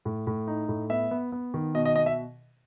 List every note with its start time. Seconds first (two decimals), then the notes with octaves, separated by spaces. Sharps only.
0.05 A2
0.27 A2
0.47 D#4
0.69 A2
0.90 B3 E5
1.11 B3
1.32 B3
1.54 D#3
1.74 B2 D#5
1.85 D#5
1.96 B2 D#5
2.06 E5